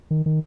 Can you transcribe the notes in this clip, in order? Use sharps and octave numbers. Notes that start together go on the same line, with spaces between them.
D#3
D#3